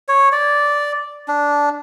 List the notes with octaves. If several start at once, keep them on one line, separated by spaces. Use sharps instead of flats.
C#5
D5
D4